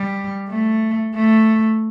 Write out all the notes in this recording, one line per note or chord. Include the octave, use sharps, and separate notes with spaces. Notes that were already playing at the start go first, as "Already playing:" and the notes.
Already playing: G3
A3
A3